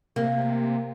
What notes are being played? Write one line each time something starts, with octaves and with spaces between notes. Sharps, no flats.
C3 A#3